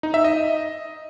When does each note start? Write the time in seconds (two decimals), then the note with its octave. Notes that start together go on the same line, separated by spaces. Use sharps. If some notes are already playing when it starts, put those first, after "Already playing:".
0.03 D#4
0.14 E5
0.24 D#5